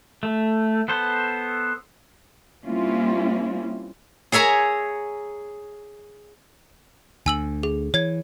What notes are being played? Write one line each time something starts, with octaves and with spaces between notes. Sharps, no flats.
A3
B3 A4 C5
G3 A#3 C4 C#4 E4 F4
G#4 C#5 E5 G#5 A#5
D2 G#5 E6 F#7
G#4
E3 C#5 G#6